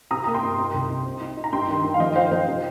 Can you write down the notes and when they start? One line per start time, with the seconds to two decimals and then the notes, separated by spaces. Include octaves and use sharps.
0.11 C3 A#5 D#6
0.24 A#3 A#5
0.34 G5 C6
0.43 D#4
0.58 C3
0.74 C2
0.89 D#4
1.05 C4
1.21 D#4
1.37 D#4
1.44 A#5
1.52 G2 G5 C6
1.69 D#3
1.84 D#3
1.94 F5
2.00 F3 D#5 G5
2.15 D#4 C5 F5
2.31 F3 C5
2.47 C3